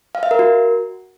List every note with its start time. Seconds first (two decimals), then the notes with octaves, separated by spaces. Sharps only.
0.15 F5
0.23 E5
0.31 A#4
0.39 F#4